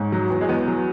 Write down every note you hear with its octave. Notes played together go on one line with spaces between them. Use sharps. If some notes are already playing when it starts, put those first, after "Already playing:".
Already playing: G#2 C#5
F#3
E2
G#3
E2 B3
F#3